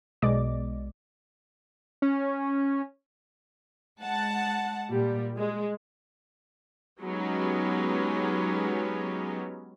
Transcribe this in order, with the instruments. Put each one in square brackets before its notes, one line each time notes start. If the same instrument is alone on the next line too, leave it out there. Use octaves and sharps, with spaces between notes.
[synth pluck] B1 B2 G#3 D5 D#5 D6
[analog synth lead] C#4
[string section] G#3 F#5 A5
A#2 G3
G#3
[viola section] F#3 G#3 B3 C#4 D#4 G4